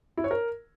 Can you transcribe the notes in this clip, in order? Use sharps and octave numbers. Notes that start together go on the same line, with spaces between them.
E4
C#5
A#4